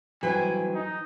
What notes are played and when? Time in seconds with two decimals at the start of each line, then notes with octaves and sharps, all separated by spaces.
0.23 G2 E3 F#3 B4 C5 G5 G#5
0.74 D#4